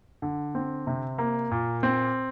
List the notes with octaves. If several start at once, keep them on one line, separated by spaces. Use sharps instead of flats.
D3
C4
C3
A#3
A#2
C4